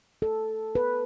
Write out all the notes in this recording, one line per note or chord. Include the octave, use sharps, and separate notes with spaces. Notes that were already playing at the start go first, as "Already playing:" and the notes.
A4
B4